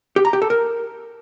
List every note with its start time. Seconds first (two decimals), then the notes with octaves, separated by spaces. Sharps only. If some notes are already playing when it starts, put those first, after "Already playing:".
0.16 G4
0.25 A#5
0.33 G4
0.42 A4
0.50 A#4